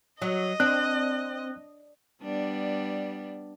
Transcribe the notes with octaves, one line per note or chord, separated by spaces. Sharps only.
F#3 D#5
C4 D4 F#6
G3 B3 D4